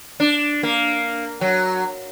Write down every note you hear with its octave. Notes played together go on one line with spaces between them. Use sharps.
D4
A#3
F#3